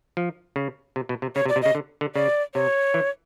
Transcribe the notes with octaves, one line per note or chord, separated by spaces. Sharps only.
F3
C#3
C3
B2
C3
C#3 C#5
C3
D5
C3
C#3 D#5
D3
D3
C#3 D5
C3 C#5
E3